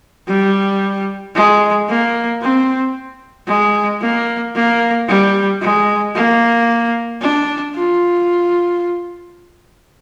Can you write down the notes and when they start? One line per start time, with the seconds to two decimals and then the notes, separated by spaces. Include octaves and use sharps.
0.28 G3
1.35 G#3
1.89 A#3
2.42 C4
3.48 G#3
4.01 A#3
4.55 A#3
5.08 G3
5.61 G#3
6.15 A#3
7.21 D4
7.75 F4